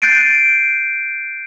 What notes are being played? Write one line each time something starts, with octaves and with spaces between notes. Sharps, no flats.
F#6 G6 A6 C7 D7 D#7